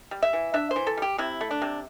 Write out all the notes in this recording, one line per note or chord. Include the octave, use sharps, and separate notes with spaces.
G3
E5
E3
D4 E5
C5
E3
A4
G3 G4
C3 E4
A3
D4
C3